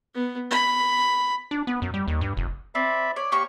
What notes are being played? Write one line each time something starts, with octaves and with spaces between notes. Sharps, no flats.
B3
B5
D4
B3
F#2
G3
D#2
G2
F1
C4 D5 E5 B5
C#5 D5
A#3 G4 C#6